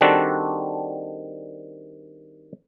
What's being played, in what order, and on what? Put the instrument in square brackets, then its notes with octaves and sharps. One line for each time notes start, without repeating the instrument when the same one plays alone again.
[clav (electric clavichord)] D#3 G3 C4 D4 F#4 A4